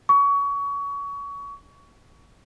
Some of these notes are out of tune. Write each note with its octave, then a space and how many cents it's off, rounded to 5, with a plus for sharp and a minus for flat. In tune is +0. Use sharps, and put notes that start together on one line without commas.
C#6 +25